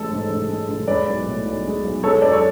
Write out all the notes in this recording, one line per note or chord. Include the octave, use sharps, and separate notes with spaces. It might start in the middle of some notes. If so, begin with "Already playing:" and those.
Already playing: A1 G#3 A4
G#2
A1
G#3
A1
G#3 B4 D5
B1
A2
B1
G#3
B1
G#3 A4 C#5
F#2 D5
A4 C#5